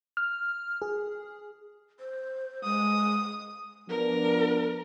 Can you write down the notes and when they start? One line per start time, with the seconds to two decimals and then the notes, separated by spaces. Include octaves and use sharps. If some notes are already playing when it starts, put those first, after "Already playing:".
0.17 F6
0.82 G#4
2.00 C5
2.64 G#3 D#6
3.89 F3 B3 D4 A#4